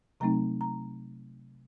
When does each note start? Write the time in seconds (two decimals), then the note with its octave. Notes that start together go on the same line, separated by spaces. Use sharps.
0.20 C3 F#3 A3 C4 D#4 A#5
0.61 A#5